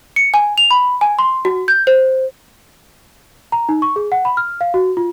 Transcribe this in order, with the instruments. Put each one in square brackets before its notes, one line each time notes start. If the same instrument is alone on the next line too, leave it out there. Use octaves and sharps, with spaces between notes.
[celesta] C#7
G#5
F7
B5
G#5
C6
F#4
G6
C5
A#5
D#4
C#6
G#4
F#5
B5
F6
F5
F#4
F4